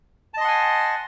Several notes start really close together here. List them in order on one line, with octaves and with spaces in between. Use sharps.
A5 D#5 C6 F#5 G#5